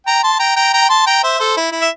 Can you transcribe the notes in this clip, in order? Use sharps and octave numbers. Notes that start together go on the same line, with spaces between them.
G5 A#5
A5 C6
G5 A#5
G5 A#5
G5 A#5
A5 C6
G5 A#5
C5 E5
A4 C5
E4
E4
E5